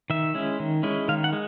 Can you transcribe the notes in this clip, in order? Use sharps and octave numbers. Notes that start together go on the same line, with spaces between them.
D#3 E5
G#3 C#4 E4
D#3
G#3 C#4 E4
D#3 F5
F#5
G#3